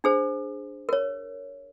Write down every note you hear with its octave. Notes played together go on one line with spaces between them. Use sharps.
D4 G#4 C5
A#4 C#5